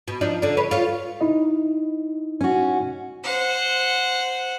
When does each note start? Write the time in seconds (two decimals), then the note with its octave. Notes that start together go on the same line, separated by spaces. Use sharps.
0.08 B2
0.21 F3 D4 D#4
0.42 D3 D4
0.57 B4 C#5
0.71 F4 C#5
1.21 D#4 E4 D#5
2.41 C#4 F#4
3.24 C5 F#5